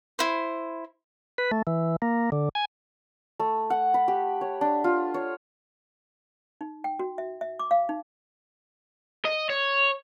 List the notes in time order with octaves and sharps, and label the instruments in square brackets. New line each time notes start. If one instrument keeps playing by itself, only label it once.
[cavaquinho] E4 C5
[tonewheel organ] B4
A3
E3
A#3
D3
G#5
[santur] A3
F#5
B5
G4
C#5
D4
F4
C#5
[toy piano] D#4
G5
F#4
E5
E5
D6
F5
D#4
[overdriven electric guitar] D#5
C#5